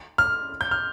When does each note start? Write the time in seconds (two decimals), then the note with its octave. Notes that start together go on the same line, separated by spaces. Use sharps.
0.18 F6
0.61 G6
0.71 F6